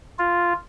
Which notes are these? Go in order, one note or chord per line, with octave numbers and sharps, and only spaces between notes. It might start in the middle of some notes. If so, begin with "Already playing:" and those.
F4